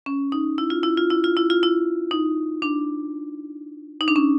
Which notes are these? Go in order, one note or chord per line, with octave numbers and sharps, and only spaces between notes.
C#4
D#4
E4
F4
E4
F4
E4
F4
E4
F4
E4
D#4
D4
D#4
D4
C#4